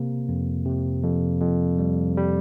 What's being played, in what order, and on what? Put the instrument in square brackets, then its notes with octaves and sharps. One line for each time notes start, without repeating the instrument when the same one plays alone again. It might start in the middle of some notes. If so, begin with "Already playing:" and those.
Already playing: [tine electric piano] C3 A#3
F2
C3
F2
F2
G3
G3